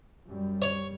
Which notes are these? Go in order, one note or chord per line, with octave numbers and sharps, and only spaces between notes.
F#2 G3
C#5